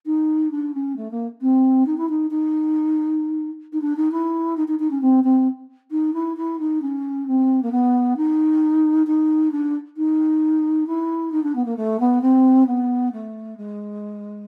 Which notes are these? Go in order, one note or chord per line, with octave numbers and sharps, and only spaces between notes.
D#4
D4
C#4
A3
A#3
C4
D#4
E4
D#4
D#4
D#4
D4
D#4
E4
D#4
D#4
D#4
C#4
C4
C4
D#4
E4
E4
D#4
C#4
C4
A#3
B3
D#4
D#4
D4
D#4
E4
D#4
D4
B3
A#3
A3
B3
C4
B3
A3
G#3